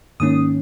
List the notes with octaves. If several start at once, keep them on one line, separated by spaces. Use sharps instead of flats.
G#2 D#3 A#3 C#4 D#6